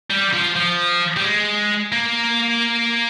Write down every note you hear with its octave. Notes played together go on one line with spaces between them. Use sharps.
G3
F3
F3
G3
G#3
A#3